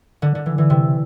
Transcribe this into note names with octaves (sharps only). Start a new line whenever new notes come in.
D3
D3
E3
E3
C3